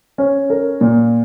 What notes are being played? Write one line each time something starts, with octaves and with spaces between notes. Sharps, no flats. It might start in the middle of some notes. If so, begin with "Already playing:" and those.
C#4
A#4
A#2